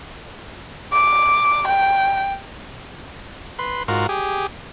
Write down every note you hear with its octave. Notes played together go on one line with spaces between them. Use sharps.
D6
G5
B4 C6
G#2 F4 F#4 A#4
G4 G#4